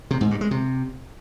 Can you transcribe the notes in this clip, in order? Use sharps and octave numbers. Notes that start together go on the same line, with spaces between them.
C3
G#2
G2
G#3
C3